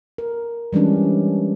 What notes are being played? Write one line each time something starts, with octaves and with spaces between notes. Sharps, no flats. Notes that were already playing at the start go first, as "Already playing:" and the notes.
A#4
E3 G3 G#3 C#4 D4